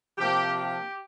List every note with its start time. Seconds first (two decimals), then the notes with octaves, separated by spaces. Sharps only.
0.18 C3 F3 A#3 D4 G4
0.55 G4